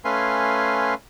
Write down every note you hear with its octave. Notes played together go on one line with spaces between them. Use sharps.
A3 C#4 B4 F5 G#5 C6